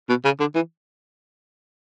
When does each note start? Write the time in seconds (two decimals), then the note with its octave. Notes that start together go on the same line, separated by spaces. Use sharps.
0.09 B2
0.25 C#3
0.40 D3
0.55 E3